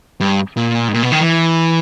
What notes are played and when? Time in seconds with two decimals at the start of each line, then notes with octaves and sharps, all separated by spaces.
0.20 G2
0.57 A#2
0.88 G#2
0.93 A#2
1.03 B2
1.12 D#3
1.20 E3